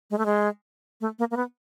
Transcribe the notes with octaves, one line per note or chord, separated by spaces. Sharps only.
G#3
A3
G#3
A3
A#3
A#3
B3